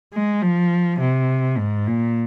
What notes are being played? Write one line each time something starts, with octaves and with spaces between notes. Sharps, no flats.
G#3
F3
C3
G#2
A#2